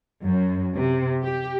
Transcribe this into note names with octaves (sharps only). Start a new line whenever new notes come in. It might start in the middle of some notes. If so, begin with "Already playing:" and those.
F#2
C3
G4